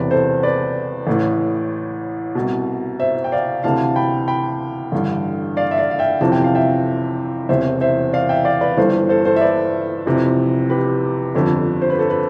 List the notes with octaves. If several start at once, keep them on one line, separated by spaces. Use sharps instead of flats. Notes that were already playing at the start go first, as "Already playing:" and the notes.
Already playing: E1 E2 C3 B4 D5
A4 C5
B4 D5
A1 A2 E3
C2 B2
C5 E5
G5
D5 F5
D2 C3 E3 F5 A5
G5 B5
G5 B5
A1 G2 D3
D5 F5
E5
D5 F5
F5
E5 G5
G1 F2 C3 E3 A5
G5
F5
E5 G5
E1 E2 C3 E3 C5 E5
C5 E5
D5 F5
E5 G5
D5 F5
B4 D5
G1 G2 E3 A4 C5
A4 C5
A4 C5
E5
B4 D5
F1 F2 C3 E3
G4 B4
G1 F2 D3
C5
B4
A4
B4